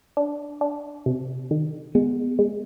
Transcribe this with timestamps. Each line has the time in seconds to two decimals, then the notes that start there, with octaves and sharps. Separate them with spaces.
0.17 D4
0.61 D4
1.06 C3
1.51 D#3
1.95 G#3 B3
2.39 G#3